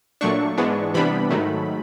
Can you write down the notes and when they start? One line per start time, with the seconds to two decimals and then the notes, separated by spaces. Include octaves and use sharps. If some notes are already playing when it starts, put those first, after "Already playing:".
0.21 A#2 F#3 A3 D4 C#6
0.58 G#2 E3 G#3 B3 D4
0.94 C3 E3 G3 B3 D4 B5
1.30 G#2 D#3 F#3 A3